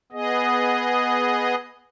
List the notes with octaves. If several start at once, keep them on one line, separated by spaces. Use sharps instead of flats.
B3 G#4 D#5